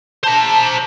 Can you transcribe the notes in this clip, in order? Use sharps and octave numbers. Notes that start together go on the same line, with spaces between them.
C5 A5 A#5